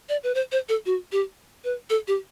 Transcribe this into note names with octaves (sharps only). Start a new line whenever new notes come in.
D5
B4
C5
C5
A4
F#4
G4
B4
A4
G4